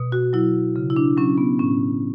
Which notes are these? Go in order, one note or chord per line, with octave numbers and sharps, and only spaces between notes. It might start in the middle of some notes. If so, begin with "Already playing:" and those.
Already playing: B2
F#4
F#3 E4
C#3
E4
D4
F#3 C#4
B3
A2 C#4